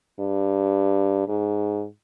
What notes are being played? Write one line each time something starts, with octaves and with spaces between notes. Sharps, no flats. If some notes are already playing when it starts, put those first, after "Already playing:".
G2
G#2